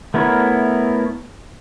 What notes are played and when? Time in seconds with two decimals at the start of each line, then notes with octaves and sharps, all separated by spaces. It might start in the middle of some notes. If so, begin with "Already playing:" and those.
0.14 A3 B3 E4 A#4 C#5